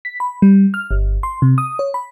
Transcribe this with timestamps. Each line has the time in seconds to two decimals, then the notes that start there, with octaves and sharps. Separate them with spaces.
0.05 B6
0.20 B5
0.42 G3
0.74 F6
0.91 G1
1.23 C6
1.42 C3
1.58 D#6
1.79 C#5
1.94 B5